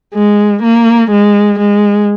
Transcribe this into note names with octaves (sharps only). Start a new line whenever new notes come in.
G#3
A#3
G#3
G#3